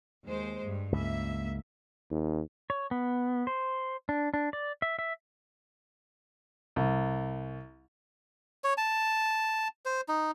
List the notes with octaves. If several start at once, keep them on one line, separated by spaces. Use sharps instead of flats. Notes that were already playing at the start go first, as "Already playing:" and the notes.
D#2 G#3 C5
G2
C#2 A#3 E5
D#2
C#5
B3
C5
D4
D4
D5
E5
E5
C2
C#5
A5
C5
D#4